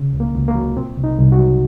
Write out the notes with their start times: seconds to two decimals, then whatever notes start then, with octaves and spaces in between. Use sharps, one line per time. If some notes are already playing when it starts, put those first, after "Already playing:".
Already playing: C#3
0.13 C#2
0.20 A#3
0.34 C#2
0.48 A#3
0.55 F#3
0.76 A#2 C4
0.97 C2
1.04 D#4
1.18 C2
1.32 F#4
1.39 F#3